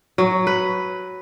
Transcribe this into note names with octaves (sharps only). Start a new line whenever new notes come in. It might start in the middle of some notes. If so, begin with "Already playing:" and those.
F#3
B4